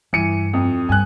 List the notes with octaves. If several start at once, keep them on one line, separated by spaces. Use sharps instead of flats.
G2 E3 C#7 D#7
F2
G2 G#5 F#6